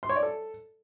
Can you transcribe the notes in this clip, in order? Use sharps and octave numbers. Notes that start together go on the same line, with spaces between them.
C6
C#5
D5
A4